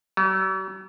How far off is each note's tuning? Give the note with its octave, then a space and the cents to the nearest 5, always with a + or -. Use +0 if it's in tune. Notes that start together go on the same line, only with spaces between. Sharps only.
F#3 +45